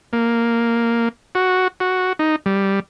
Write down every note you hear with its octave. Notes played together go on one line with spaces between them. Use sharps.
A#3
F#4
F#4
D#4
G3